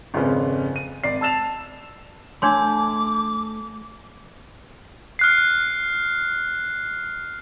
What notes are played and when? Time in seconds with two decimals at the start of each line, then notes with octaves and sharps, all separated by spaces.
0.14 G#1 F2 C#3 C4 C#4 B4
0.76 D#7
1.04 G#1 D5 C7
1.21 A5 E6 A6 E7 F7
2.42 A3 D4 C#5 C6 D6
5.19 F6 F#6 C7